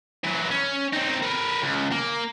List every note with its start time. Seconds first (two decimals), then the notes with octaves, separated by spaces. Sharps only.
0.24 E3 F#3
0.51 C#4
0.93 C4 D#4
1.22 A#4 B4
1.62 C#2
1.92 A#3